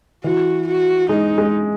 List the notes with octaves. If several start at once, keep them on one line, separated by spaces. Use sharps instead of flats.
E3 F#4
F#4
G#3 D#4
G#3